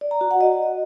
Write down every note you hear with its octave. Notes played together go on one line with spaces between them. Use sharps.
D5
A#5
F#4
F#5
D#5